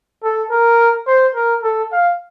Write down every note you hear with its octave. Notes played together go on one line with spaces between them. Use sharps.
A4
A#4
C5
A#4
A4
F5